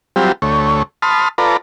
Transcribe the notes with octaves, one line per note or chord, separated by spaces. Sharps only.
F#3 G3 C4 F4 G4
D2 A3 C#5
A5 B5 C6 D#6 F6
F4 A4 B4 D5 A#5